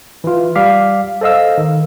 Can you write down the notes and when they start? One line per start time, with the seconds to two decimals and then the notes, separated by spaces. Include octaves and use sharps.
0.24 E3 F4
0.55 G3 F5 D6 B6
1.21 A4 C5 D#5 F5 E6
1.58 D#3